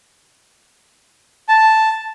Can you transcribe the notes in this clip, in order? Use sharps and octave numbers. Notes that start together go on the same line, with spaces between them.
A5